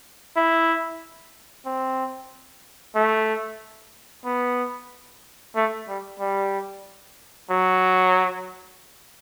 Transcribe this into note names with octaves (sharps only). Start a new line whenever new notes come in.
E4
C4
A3
B3
A3
G3
G3
F#3